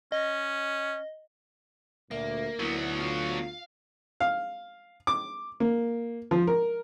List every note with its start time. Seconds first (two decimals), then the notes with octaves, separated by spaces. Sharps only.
0.12 C#4 D#5
2.11 D2 A#2 A#3 E5
2.60 D2 F#3 B3 E4
3.00 F4 F5
4.20 F5
5.07 D6
5.60 A#3
6.31 F3
6.47 A#4